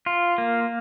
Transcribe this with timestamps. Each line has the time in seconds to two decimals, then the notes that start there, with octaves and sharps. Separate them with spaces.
0.06 F4
0.38 A#3